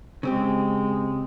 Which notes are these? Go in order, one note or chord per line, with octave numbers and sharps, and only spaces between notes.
C#3 G#3 C4 G4